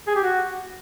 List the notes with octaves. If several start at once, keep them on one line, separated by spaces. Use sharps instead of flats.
G#4
G4
F#4